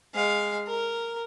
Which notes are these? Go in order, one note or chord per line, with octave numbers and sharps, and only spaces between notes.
G#3 F5
A#4